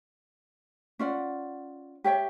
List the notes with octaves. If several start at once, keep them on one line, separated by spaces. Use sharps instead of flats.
C#4 F4 D5 F#5
G4 C#5 E5 G5